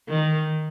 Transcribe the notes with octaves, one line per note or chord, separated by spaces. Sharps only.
D#3